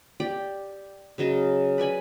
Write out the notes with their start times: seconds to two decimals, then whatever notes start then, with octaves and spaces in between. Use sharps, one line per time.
0.20 G4 D5 G5
1.18 C#3 F#3 D#5 A5
1.78 B4 D5 G#5 B5